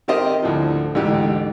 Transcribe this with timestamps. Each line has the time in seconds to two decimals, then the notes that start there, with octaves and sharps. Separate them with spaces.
0.08 D#3 C4 G4 A#4 C5 D#5
0.43 D2 A2 F3
0.95 A1 D2 G#2 G4